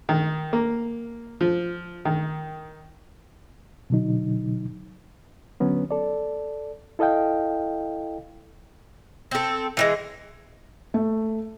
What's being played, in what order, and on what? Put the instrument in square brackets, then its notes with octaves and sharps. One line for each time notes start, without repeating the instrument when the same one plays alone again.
[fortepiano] D#3
A#3
F3
D#3
[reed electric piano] B2 D3 F#3 D#4
D3 F#3 B3 C#4
A4 D5
E4 A4 D#5 F5 G5
[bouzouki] C4 A4
E3 G3 G#3
[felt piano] A3